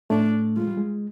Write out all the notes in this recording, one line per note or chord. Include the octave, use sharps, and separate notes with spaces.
A2 A3 D4
G#3 F4
G3
G#3